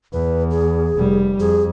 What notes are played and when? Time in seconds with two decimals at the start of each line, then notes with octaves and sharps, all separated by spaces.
0.13 E2 B4
0.51 G#4
0.97 F1 G3
1.40 F2 G#4